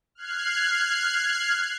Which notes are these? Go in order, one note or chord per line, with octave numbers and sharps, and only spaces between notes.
F6 F#6 G#6 C7